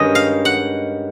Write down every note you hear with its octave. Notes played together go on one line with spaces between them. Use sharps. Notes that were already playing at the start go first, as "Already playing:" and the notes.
Already playing: G2 D#3 G#3 C#4 D#5
F5
F#5